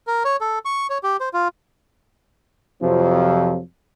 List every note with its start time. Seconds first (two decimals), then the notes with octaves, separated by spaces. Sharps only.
0.07 A#4
0.25 C#5
0.41 A4
0.65 C#6
0.90 C#5
1.03 G4
1.20 C5
1.34 F4
2.82 F2 C3 F3 F#3